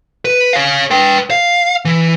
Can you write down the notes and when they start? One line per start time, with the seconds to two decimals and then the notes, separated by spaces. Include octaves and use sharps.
0.25 B4
0.53 C#5 F5
0.91 B4 G5
1.30 F5
1.85 E3